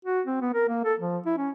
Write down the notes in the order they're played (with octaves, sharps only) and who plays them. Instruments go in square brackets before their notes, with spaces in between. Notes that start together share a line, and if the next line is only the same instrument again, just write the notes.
[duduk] F#4
C4
B3
A#4
A#3
A4
F3
E4
C#4